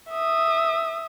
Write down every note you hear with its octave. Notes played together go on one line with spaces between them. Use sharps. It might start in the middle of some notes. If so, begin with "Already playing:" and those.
E5 D#6